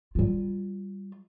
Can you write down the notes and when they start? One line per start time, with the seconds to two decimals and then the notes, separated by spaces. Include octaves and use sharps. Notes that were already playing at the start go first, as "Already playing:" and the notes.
0.15 G3 F4